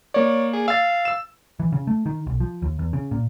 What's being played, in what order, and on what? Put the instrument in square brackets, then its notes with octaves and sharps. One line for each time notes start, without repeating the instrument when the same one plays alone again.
[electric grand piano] A#3 D5 [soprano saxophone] C#5
[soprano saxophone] G#4
[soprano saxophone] F5 [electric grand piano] E6 A6
[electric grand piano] E6 E7
[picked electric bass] E3
C#3
A3
D#3
B1
F3
D#2
E2
C#3
A#2